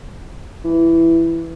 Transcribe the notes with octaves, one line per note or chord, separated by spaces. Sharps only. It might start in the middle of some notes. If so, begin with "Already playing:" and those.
E3